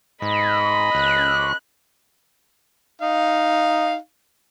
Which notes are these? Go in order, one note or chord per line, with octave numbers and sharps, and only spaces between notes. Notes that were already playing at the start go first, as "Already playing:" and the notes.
G#2 D#5 B5
C#2 F#6
D#4 F5